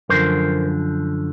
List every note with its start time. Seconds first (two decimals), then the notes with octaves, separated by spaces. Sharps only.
0.09 F#2 D3 F3 A#4 C5